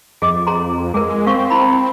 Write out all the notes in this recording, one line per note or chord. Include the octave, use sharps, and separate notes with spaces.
F2 G#4 D#5 D6
G#4 A#5 C6
G#3 G#4 A#4
C4 F5 C#6
E4 B5